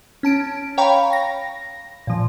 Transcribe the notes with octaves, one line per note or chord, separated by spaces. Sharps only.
C#4 A5 D7
C#5 F5 G5 A#5 B5 C#6
A#6
A#2 F3